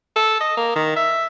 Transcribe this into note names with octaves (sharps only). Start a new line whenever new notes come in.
A4
D#5
A#3
D#3
E5